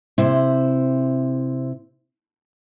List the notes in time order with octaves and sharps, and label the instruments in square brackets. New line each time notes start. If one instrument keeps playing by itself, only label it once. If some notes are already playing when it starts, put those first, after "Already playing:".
[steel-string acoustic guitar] C3 E4 C5